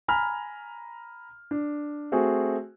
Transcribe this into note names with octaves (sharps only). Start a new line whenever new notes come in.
G#5 A#5 B5 F6
D4
A3 C4 F#4 G#4